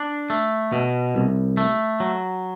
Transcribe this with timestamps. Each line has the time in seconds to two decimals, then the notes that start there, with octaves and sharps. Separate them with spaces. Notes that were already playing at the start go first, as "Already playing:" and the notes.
Already playing: D4
0.30 A3
0.73 B2
1.15 C2
1.57 A3
2.00 F#3